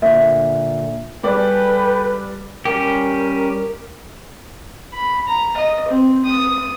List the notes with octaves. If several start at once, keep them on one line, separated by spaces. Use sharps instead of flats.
A#2 D3 E5
G3 G#4 A4 B4 D5 G5
G3 C#4 G4 A#4
B5
A#5
D#5
C4
D#6